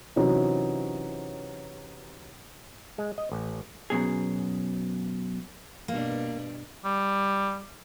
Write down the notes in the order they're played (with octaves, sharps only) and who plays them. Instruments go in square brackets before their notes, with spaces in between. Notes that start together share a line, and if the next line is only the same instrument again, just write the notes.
[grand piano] C3 E3 F#3 C#4 D#4
[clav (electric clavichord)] G#3
D#5
A1
[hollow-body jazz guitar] F#2 B2 G#4
[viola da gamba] G2 B2 D4 [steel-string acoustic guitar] A#3
[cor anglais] G3